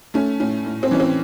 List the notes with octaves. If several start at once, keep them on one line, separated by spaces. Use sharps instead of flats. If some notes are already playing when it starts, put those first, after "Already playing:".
A3 C#4
A2 C#4
A2
C4
E3 C#4
C4